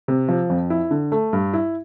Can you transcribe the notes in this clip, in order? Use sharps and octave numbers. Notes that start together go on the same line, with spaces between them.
C3
F3
F2
E4
D3
A3
G2
E4